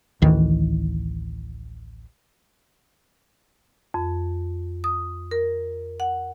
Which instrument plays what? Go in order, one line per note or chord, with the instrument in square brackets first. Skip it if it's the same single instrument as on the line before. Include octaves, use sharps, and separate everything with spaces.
[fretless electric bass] A1 D2 D#3 E3
[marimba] F2
D#6
A#4
F#5